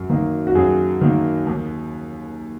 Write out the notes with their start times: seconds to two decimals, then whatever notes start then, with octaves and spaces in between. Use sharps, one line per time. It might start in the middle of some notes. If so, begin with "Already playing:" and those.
Already playing: F#2
0.10 D#3 A#3
0.47 F#4
0.55 F#2 G#4
1.01 D#3 A#3
1.47 D#2